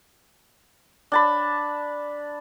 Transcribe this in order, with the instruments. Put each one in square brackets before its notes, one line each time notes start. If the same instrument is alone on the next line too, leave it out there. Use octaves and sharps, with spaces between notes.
[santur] D4 A5 B5